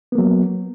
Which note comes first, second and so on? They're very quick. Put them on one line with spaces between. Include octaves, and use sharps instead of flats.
B3 A#3 F#3